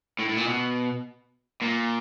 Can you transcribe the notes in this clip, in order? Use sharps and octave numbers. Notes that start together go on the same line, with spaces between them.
A2
A2
A#2
B2
A#2